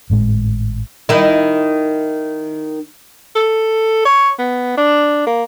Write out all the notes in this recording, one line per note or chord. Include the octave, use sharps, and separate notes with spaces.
G#1 A2 G#3
D#3 E4
A4
C#5
B3
D4
A#3